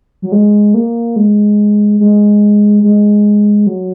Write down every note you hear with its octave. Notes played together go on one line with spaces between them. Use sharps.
F#3
G#3
A#3
G#3
G#3
G#3
F#3